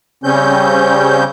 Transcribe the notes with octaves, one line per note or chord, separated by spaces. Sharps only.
C#3 G3 C4 C#4 G6